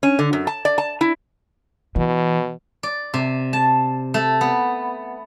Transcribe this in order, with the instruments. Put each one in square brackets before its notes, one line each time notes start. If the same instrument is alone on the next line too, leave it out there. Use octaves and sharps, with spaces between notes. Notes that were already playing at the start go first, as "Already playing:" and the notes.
[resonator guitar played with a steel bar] C#4
D3
F#2
A5
D5
A5
E4
[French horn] B2 [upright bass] E3
[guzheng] D5
C3
A5
A3
B3